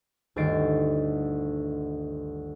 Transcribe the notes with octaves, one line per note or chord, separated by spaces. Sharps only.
G1 D2 D#3 A6 C7 D7